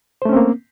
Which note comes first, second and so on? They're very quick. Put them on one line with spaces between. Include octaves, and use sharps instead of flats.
C5 A3 C#4 C4 A#3